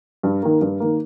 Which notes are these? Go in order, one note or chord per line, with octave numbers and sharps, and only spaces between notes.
G2
D#3 A#3
G2
D#3 A#3